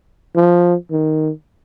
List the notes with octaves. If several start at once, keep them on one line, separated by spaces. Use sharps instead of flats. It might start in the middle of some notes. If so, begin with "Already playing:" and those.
F3
D#3